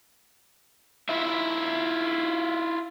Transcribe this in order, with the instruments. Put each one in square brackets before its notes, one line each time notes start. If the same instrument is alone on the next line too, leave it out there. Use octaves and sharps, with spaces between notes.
[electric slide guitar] E4 F4 E5